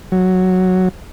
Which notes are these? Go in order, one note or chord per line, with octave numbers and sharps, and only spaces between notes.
F#3